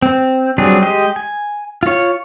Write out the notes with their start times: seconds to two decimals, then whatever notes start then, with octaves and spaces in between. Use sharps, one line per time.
0.02 C4
0.58 F#3 G3 C4 D4 G#4
0.82 G#3 G4 D#5
1.16 G#5
1.83 F4 C#5